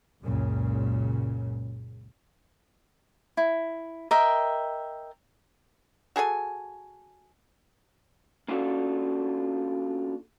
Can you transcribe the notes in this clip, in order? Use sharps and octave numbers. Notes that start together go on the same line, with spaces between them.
C#2 F#2 A#2 C#3
E4
A#4 D#5 E5 G5
F#4 G#4 A4 G#5
A#3 C#4 D4 F4 F#4 A4